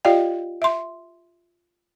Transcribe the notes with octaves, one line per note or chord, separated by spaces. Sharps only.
F4 G4 D5 D#5 F5 G5
E5 C6